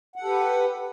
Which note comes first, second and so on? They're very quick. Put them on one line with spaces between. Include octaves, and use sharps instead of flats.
F#5 A4 G4 B4